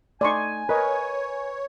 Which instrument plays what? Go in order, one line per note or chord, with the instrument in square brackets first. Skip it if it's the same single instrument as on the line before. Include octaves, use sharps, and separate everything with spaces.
[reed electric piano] A3 D#4 [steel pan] D5 C6 C#6 [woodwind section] G#5
[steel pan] A#4 D#5 [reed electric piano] B4 [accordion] C#5